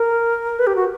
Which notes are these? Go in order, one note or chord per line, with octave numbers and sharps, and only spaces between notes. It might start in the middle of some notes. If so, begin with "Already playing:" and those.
Already playing: A#4
B4
G4
F#4